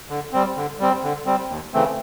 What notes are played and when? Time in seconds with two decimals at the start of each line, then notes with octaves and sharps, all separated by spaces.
0.10 D3
0.33 G3 C4
0.57 D3
0.80 G3 C4
1.03 D3
1.26 G3 C4
1.49 D#2
1.73 C#3 E3 A3 C4